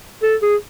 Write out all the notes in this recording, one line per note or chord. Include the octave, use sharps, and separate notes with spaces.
A4
G#4